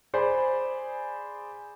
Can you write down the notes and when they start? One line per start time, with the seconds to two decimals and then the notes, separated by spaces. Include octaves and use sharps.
0.14 G#4 C5 D5 G#5 B5